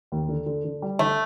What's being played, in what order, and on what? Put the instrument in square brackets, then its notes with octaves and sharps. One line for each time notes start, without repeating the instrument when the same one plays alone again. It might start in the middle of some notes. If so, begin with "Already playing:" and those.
[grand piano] D#2
D3
D3
D3
G3
[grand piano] D3 [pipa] A3